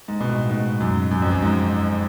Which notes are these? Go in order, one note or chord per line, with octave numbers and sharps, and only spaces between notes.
G#2
B2
A2
G#2
F#2
F#2
F2
F#2
G#2